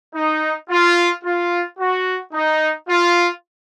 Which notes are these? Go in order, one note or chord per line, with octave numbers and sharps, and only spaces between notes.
D#4
F4
F4
F#4
D#4
F4